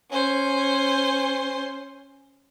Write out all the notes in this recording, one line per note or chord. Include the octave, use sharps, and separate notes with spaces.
C#4 C5